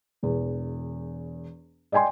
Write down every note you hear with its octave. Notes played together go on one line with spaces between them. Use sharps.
E1 E2
D5 D#5 G5 G#5 C6